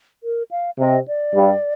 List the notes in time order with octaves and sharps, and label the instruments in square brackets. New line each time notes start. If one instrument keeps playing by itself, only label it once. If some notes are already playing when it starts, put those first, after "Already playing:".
[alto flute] A#4
F5
[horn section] C3 [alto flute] D#5
[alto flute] D5
[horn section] G2 G3